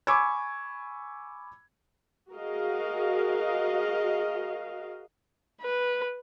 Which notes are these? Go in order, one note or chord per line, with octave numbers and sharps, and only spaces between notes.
G#5 B5 C#6 D6 E6 G#6
F#4 G#4 A#4 D#5 F5
B4